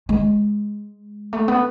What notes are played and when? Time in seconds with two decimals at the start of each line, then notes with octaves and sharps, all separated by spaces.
0.09 G#3
1.33 A3
1.48 B3